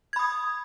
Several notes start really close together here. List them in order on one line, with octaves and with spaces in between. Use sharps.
G#6 B5 D#6